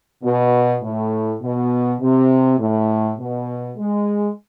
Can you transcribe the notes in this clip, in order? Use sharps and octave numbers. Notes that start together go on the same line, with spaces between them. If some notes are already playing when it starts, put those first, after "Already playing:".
B2
A2
B2
C3
A2
B2
G#3